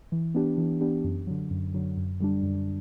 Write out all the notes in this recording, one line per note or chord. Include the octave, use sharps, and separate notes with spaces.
E3
B3 D4 G4
E3
B3 D4 G4
F#2
D3 F#3
F#2
D3 F#3
F#2
D3 G3 D4
F#2